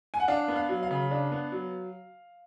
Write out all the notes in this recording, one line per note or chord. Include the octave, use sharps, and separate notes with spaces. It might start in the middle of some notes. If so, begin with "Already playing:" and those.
G#5
F#5
D4 F5
B3
F5
F#3
F5
C#3
D4
B3
F#3